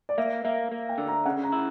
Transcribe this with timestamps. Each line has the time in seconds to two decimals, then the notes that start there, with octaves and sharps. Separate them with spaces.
0.09 D5
0.18 A#3 E5
0.44 A#3 E5
0.72 A#3
0.89 G5
0.98 D3
1.08 A#5
1.25 C#3 F#5
1.43 A#5
1.52 E4